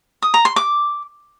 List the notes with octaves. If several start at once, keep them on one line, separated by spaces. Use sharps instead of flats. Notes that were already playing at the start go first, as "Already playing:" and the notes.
D#6
A#5
C6
D6